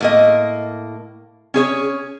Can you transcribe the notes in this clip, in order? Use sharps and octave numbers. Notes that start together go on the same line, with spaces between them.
A2 A#3 D#5
C#4 G#4 C#5